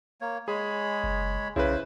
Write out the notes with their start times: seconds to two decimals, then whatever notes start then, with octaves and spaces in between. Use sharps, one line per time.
0.21 A#3 C#5
0.48 G#3 G#4 C#5 B5
1.04 F#1
1.56 B1 C#3 E4 B4 C5